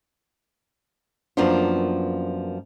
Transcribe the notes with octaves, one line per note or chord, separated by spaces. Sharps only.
F#2 F3 A#3 B3 D4 F4